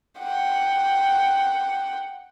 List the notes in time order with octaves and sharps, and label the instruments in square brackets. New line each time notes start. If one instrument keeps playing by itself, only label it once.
[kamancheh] F#5 G5